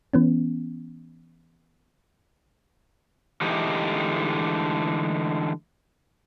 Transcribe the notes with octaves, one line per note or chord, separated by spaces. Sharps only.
E3 B3 C#4
D3 E3 G#3 A3 D#4 G4